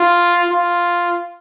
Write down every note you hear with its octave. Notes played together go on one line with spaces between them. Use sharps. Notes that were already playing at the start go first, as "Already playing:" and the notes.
Already playing: F4
F4